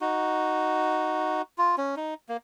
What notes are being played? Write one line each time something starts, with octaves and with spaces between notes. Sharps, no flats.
D#4 F#4
F4
C#4
D#4
A#3